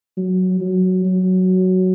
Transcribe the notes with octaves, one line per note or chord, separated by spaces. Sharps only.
F#3
F#3
F#3